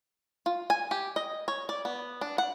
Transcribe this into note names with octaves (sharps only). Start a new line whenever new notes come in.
F4
G#5
G4
D#5
C#5
D5
B3
D4
F#5